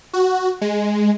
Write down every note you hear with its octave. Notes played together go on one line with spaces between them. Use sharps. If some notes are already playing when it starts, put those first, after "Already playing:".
F#4
G#3